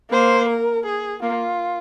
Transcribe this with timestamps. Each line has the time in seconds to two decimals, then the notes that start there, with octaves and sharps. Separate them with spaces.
0.12 A#3 C5
0.49 A#4
0.86 G#4
1.23 A#3 F4